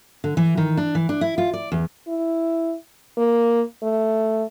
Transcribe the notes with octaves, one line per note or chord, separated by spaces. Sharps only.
D3
E3
D#3
D4
E3
D4
E4
F4
D5
E2
E4
A#3
A3